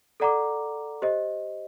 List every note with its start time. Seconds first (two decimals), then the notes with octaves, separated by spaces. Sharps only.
0.20 A4 D5 F#5 A#5 D6
1.02 G4 C5 D#5